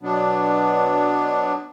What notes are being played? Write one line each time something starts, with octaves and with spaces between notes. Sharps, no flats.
B2 F#3 B3 D4